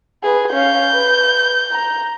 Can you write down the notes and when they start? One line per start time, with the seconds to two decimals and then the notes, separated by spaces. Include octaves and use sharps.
0.23 G#4 B4
0.53 C#4 F5 G6
0.91 B4
1.72 A#5